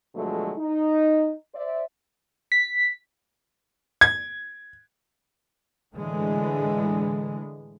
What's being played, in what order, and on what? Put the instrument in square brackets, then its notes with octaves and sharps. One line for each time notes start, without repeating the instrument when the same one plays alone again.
[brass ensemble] B2 D3 F3 F#3 G#3 A3
D#4
C5 D5 E5
[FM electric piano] B6
[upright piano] G#6
[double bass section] A2 D3 E3 G#3